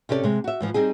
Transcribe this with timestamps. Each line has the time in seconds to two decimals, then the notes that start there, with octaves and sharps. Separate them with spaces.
0.09 C3 C#4 G4 A4 C5 D5
0.24 C3 G#3
0.44 F#4 E5
0.61 G#2 E3 F3
0.74 G3 C4 D#4 G#4